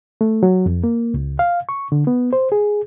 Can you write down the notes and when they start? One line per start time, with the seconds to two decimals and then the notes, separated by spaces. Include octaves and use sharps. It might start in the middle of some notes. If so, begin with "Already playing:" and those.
0.21 A3
0.43 F#3
0.66 F2
0.84 A#3
1.14 C#2
1.39 F5
1.69 C#6
1.92 D3
2.07 B3
2.33 C5
2.52 G#4